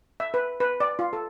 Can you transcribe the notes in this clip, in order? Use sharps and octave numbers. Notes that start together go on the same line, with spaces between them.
E5
B4
B4
D5
F4
A4